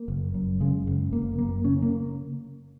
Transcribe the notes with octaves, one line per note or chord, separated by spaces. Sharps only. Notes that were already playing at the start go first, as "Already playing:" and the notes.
Already playing: A#3
F#1
F#2
C#3 G#3
F#1
F#1 A#3
F#2 A#3
C#3 C#4
A#3